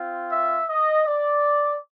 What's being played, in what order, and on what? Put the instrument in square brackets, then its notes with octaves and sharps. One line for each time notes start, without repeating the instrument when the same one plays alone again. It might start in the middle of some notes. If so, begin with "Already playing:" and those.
Already playing: [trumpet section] C4 F4
E5
D#5
D5